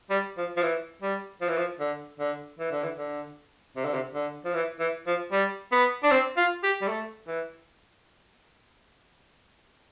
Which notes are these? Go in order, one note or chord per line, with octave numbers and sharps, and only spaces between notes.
G3
F3
F3
E3
G3
F3
E3
F3
D3
D3
E3
D3
E3
D3
C3
D3
C3
D3
F3
E3
E3
F3
G3
B3
D4
C4
F4
G4
G3
A3
E3